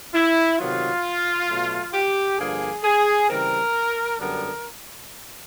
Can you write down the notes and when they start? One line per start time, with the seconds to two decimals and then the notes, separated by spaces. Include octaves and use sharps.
0.13 E4
0.59 C3 D#3 F#3 B3 F4
1.49 B2 F#3 A3
1.94 G4
2.39 G2 D3 F3 A#3 G#4
2.84 G#4
3.29 C#3 E3 G3 C4 A#4
4.19 F#2 D3 G3 B3 D4 A#4